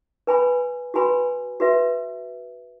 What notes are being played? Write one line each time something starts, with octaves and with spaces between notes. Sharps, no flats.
B4 G#5 B5
F#4 B4 G#5 B5
F#4 B4 E5